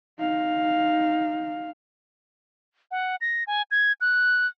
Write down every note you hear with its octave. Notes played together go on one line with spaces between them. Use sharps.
D#4 F5
F#5
A#6
G#5
G#6
F#6